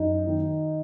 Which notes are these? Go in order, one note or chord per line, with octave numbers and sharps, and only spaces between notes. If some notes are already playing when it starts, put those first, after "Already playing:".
Already playing: F#2 D#4
D#3